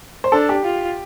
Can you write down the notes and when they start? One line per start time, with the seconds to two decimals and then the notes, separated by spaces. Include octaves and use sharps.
0.24 C5
0.32 D4 A4
0.49 G4
0.65 F4